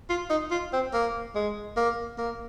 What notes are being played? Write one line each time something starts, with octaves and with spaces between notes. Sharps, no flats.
F4
D#4
F4
C4
A#3
G#3
A#3
A#3